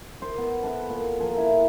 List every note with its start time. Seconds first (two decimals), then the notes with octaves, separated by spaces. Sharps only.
0.22 A#4 C5
0.38 B3
0.63 A4 B4 F#5 B5
0.89 A#2 A4
1.19 F3 G#4 A#4
1.37 E4